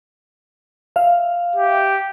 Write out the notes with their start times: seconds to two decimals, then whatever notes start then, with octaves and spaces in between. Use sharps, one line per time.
0.96 E5 F5
1.56 G4